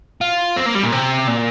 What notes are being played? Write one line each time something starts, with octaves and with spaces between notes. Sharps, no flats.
F4
C4
A#3
G3
A#2
C3
A#2